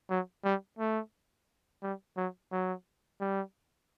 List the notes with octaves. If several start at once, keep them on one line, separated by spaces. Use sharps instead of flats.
F#3
G3
A3
G3
F#3
F#3
G3